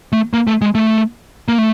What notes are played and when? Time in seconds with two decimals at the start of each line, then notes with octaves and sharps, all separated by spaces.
0.13 A3
0.33 A#3
0.47 A3
0.62 G#3
0.75 A3
1.48 A#3
1.58 A3